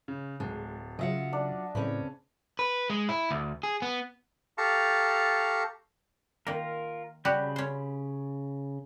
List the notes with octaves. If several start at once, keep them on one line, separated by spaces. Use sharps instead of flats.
C#3
D1 G#3 A5
C#3 F#3 F4 D#5 E5 F#5
D4 D5
A2 C#3 C4 C#4 B4
B4
G#3
E4
D2
G#4
B3
G4 A4 F5 A5 A#5 C#6
D#3 A#3 F4 A#4
C#3 G3 F#4 G4 B5 G6
C#4 C5